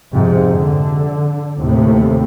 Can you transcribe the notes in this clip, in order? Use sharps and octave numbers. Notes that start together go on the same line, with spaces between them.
F2 G#2 C3
D3
D#2 A2 C3 A3